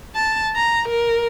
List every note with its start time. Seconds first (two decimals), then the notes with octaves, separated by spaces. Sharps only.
0.15 A5
0.56 A#5
0.88 A#4